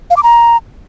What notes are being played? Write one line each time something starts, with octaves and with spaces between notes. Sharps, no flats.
F5
D6
A#5